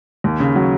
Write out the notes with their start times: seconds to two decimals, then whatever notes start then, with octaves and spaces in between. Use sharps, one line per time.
0.24 D#2
0.40 C#3
0.55 F#3